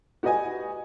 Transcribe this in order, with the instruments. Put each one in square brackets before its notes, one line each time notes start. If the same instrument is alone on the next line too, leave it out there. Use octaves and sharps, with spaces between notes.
[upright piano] F#4 G4 B4 D#5 G#5